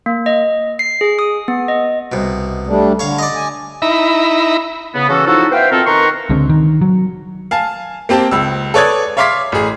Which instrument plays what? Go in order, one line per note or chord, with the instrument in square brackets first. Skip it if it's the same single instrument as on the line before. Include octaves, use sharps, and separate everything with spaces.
[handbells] A#3
D#5
C7
G#4
D#6
B3
D#5
[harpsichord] C2 B2
[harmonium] G3 A3 D4
[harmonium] D3 [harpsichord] C#5 F5
[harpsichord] D5 D#5
[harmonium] G#5
[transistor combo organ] D#4 E4 E5 A#5 B5
[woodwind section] C#3 B3
C#3 E3 C#4 F#4 A4
F3 D#4 E4 F#4 A4
B3 C5 E5 F5 G5
B2 C4 F4 A4 A#4
D#3 A#4 B4 A#5 C6 C#6
[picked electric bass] C#2 D3 G#3 C4
D#3
F#3
[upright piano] F5 G#5 A5
A#3 C4 G4 A5
C#2 E6
A4 B4 C#5 D5 D#6 G#6
C#5 E5 F5 C6 D6 B6
A1 G#4